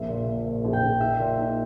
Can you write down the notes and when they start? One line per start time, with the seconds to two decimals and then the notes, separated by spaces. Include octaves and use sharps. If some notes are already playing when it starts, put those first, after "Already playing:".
Already playing: A#1 A#3 E5
0.08 A#2
0.28 A#2
0.46 A#2
0.65 A#1
0.73 G5
0.82 A#1
1.00 D#4 E5
1.19 A#2
1.38 D#4